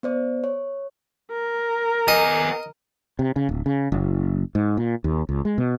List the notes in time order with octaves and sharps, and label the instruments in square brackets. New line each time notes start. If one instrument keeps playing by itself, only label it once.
[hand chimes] B3 C5 D5
C#5
[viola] A#4
[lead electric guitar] B3 G#5 [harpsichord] D#5
[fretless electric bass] C3
C#3
D1
C#3
F#1
G#2
A#2
D#2
C#2
G#3
B2